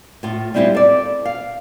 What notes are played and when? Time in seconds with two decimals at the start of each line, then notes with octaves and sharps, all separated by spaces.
0.23 A2 F4
0.54 G3 G#3 C4 E4 F4 G4
0.75 A4 D5
1.25 F5